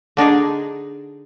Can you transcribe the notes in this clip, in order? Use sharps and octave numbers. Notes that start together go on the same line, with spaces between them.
D3 D4 D#4 G#4